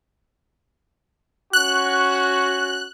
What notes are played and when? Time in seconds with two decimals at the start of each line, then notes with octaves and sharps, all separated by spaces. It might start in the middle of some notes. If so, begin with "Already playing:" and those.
1.53 C#4 F#4 F#6